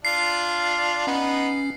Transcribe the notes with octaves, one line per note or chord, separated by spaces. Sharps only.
D4 F4 F5 C7
B3 C#4 D#4 F#5